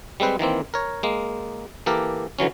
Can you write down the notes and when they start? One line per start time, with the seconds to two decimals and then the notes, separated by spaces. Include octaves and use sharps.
0.20 G3 G#3 C4 B4 C5
0.39 D#3 E3 A#3 C4
0.74 A#4 C#5
1.03 G#3 A#3
1.86 E3 A#3 G4 A4 A#4
2.39 D3 E3 F#3 C#4